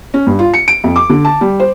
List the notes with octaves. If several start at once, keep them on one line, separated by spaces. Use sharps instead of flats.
C#4
G2
F4
C#7
D7
F2
D6
D3
A5
G3
C5